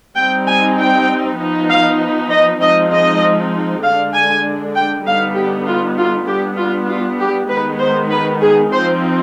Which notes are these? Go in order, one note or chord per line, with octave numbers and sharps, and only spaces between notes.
G3 C4 D#4 G5
G#5
G5
F3 B3 D#4
F5
D#5
F3 G#3 C4 D#4 D#5
D#5
D3 G#3 D4 F5
G#5
G5
D3 G3 B3 D#4 F5
G4
F4
F4
G3 B3 D4 G4
F4
F4
G4
D#3 G#3 B3 D#4 B4
C5
B4
G#4
F3 C4 D#4 C5